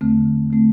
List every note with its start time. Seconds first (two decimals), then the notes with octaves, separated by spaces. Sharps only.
0.01 E2 D3 A3 C4
0.51 D3 A3 C4